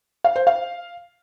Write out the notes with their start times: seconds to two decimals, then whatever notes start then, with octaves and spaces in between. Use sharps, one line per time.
0.24 F5
0.36 C5
0.47 F5